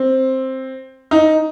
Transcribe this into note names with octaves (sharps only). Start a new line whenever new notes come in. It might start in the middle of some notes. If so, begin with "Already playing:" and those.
Already playing: C4
D#4